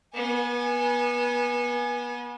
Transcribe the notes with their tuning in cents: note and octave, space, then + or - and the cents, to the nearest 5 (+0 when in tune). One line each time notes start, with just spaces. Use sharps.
B3 -30 G#5 +0